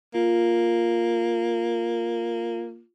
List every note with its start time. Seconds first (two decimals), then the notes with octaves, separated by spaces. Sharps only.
0.14 A#3 F4